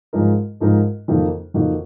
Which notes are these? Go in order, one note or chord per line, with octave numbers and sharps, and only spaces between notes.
G#2 F3 G#3 D#4 A#4
G#2 F3 G#3 D#4 A#4
F2 D#3 A#3 D#4 F#4
F2 D#3 A#3 D#4 F#4